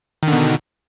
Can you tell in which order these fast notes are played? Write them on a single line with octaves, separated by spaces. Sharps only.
D#3 D3 B2